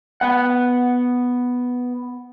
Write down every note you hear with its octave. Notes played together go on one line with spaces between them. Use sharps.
B3 F#5